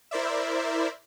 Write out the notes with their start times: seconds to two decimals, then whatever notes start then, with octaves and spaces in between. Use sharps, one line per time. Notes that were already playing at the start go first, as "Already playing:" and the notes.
0.11 E4 A#4 C5 D5 E5